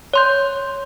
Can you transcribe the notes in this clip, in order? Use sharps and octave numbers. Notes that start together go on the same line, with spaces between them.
C#5 C6 G6